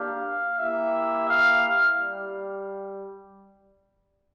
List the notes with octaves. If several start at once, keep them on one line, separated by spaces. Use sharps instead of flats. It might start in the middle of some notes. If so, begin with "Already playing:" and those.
Already playing: A#3 D4 G4 F5
A#3 E4 G4 E5
F5
G3